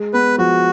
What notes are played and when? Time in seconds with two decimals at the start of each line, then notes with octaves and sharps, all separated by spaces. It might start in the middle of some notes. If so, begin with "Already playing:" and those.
Already playing: G#3
0.13 B3 B4
0.38 F3 F#4